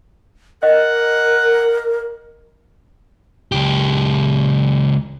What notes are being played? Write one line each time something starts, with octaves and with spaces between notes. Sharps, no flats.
A#4 D#5 F#5
C#2 G4